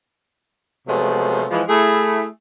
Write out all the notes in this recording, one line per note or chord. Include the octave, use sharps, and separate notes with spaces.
C3 F3 F#3 G#3 A3 B3
E3 F3 G#3
A3 E4 G#4